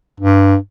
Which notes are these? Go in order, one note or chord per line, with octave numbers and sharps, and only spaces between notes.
G2